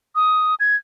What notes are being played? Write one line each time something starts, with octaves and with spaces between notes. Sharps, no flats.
D#6
G#6